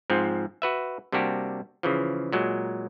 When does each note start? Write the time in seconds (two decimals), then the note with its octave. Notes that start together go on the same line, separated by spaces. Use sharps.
0.10 G#2 F3 C4
0.62 F#4 B4 E5
1.12 C3 G3 A#3 D4 F#4 G4
1.83 C#3 E3 F3
2.32 A#2 F#3 G#3